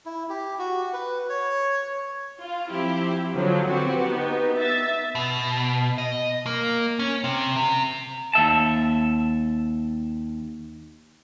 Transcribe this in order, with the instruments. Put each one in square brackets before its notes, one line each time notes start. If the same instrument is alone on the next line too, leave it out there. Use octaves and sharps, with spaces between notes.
[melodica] E4
G4
F#4
B4
C#5
[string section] F4
F3 C4 E4 G4
D3 F3 F#3
B3 C4 F#4 G4
B3 D#4
E5 A6
[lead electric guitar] B2
D#5
A#3
C#4
C3
C3
[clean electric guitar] D#2 E5 A5